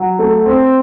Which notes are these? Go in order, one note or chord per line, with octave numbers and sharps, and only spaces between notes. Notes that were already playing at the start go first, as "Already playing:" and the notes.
Already playing: F#3
A3
C4